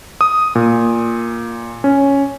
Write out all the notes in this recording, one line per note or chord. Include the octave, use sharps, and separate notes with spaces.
D#6
A#2
C#4